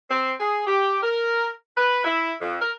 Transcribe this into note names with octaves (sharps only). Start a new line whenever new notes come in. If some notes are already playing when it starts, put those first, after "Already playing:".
C4
G#4
G4
A#4
B4
E4
F2
A#4